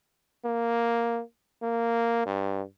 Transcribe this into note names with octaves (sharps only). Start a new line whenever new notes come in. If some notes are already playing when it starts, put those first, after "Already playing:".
A#3
A#3
G2